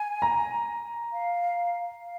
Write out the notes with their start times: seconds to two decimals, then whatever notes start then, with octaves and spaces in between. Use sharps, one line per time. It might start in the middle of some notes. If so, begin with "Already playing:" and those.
Already playing: G#5
0.22 A#5
1.12 F5
2.03 F5